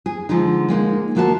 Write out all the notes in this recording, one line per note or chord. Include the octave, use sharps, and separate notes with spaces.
G#4
D3 F3 G#3 D#4
G#3 A#3 D4 D#4
D2 F3 A#3 F#4 E5 A5